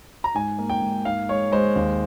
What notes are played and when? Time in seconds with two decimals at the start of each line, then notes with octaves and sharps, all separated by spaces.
0.24 A#5
0.34 G#2 G#5
0.59 A#3
0.70 G5
0.81 G#2
1.05 G#2 F5
1.29 G#3 C#5
1.52 G#3 C5
1.76 D#2